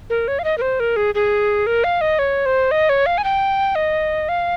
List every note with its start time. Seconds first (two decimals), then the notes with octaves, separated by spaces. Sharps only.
0.10 A#4
0.28 C#5
0.39 F5
0.44 D#5
0.58 A#4
0.62 C5
0.80 A#4
0.96 G#4
1.15 G#4
1.67 A#4
1.84 F5
2.01 D#5
2.19 C#5
2.46 C5
2.71 D#5
2.89 C#5
3.06 F5
3.18 G#5
3.24 G5
3.75 D#5
4.29 F5